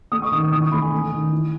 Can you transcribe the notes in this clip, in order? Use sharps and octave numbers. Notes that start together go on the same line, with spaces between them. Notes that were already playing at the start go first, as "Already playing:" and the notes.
A3 D#6
C#6
D#3 D#6
E3 D#6
C#6
A3 B5
G#5
A3
D#3
E4